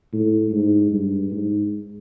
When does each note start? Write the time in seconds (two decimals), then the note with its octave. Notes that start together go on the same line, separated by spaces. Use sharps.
0.13 A2
0.51 G#2
0.92 G2
1.32 G#2